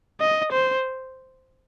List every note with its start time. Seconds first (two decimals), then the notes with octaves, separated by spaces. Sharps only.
0.21 D#5
0.52 C5